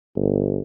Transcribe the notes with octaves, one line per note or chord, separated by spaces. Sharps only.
G1